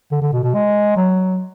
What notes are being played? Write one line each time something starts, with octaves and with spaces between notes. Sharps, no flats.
D3
D3
B2
B2
G#3
F#3